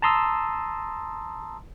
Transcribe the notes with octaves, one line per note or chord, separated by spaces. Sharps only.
A5 A#5 C6 D#6 E6